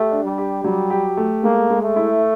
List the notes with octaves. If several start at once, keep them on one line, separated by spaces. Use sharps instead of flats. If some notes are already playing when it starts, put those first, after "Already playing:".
Already playing: A3 G4
D4
G3
G4
F#3 G3
G4
A3
G#3 A#3
G#3
A3
E4